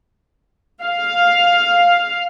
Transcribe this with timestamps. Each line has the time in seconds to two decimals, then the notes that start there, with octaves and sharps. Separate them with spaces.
0.83 F5